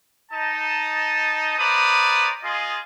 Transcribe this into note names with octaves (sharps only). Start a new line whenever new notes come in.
D#4 D#5 A5
E4 B4 C5 D5 A#5 D#6
F4 G#4 D#5